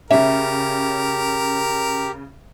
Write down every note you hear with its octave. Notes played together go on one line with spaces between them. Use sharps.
C#3 C#4 G4 A#4 E5